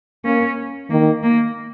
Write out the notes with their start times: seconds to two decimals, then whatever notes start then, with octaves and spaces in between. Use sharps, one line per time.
0.25 A#3 C#4
0.90 D#3 A#3
1.23 A#3